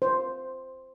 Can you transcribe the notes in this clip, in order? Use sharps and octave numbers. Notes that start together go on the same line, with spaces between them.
C5